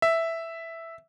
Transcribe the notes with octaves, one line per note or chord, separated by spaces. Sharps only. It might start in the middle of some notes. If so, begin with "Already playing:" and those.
E5